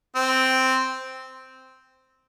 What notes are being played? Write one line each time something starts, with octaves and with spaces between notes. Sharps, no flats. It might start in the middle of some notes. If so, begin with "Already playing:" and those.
C4